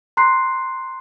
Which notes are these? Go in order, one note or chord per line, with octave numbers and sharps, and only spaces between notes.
A#5 C6 F#6 C7